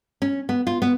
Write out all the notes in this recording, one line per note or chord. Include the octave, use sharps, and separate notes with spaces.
C#4
B3
F4
B3